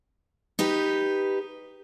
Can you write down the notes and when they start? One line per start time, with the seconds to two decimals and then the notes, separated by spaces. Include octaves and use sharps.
0.59 D#4 G4 B4